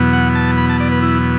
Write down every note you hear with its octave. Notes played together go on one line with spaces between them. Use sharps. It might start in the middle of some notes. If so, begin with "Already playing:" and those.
Already playing: E2 B2 F#3 B3
F#5
A5
B5
A5
D5
B4
E4